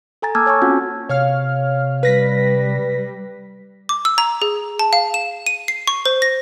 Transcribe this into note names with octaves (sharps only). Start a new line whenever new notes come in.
A4 G#5 A#5 A6
A#3 A5 D6 E6 F6 G#6
C#5 G#5 A5 C#6
C4 C#4 F4 F#4 F#5
C3 C#5 F5 F6
G3 B4 A#6 B6
D6
E6
A#5
G#4
A5
F5
E7
D#7
C7
C#6
C5
A#6